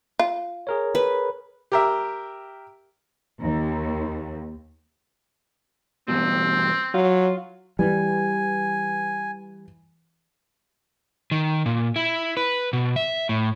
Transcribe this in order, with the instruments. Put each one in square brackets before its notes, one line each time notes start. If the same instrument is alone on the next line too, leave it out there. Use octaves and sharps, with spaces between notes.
[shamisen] F4
[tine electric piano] G#4 A#4 C#5
[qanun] B4
[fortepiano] G4 A#4 E5
[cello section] D#2
[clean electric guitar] E2 G2 B2 [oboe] C4
[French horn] F#3 [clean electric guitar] F4
[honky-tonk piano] E3 [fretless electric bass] G3 [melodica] G#5
[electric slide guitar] D#3
A#2
E4
B4
B2
E5
A2